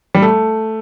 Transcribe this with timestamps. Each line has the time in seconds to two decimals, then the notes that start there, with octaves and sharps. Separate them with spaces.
0.14 G3
0.22 A3